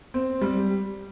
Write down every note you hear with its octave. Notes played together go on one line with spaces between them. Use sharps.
C4
G3